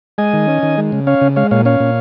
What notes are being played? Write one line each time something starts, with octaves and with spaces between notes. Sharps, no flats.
G#3 D#5 G#5
D#3
C#4
D#3
G#3
C#3
C#4 C#5 F5
C#3
G#3 C#5 F5
A#2 C#5 F5
C#4 C#5 F5
A#2